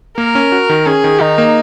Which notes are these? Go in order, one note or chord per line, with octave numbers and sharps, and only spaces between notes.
A#3 A#4
C#4
F#4
D#3
C#4 G#4
D#3
D#3 D#4
A#3